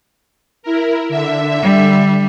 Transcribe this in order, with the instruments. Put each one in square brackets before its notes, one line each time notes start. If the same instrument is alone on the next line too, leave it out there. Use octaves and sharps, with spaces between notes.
[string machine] E4 A#4
D3 E5
[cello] G3